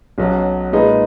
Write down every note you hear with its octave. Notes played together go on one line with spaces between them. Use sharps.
B1 B2 F#3 C#4
A#2 G#3 D#4 G#4 B4